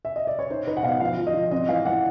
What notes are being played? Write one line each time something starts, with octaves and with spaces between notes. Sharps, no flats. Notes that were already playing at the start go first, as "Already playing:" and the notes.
E5
D#5
D5
C#5
D#4 C5
D#4 B4
F#5
B2 F5
F3 F5
F3
D#5
F3
C4 D#5
E3 F5
E3 F#5